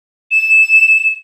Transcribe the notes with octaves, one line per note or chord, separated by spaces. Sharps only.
E7